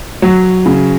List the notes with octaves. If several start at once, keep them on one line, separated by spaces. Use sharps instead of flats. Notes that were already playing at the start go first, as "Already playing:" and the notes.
F#3
C#3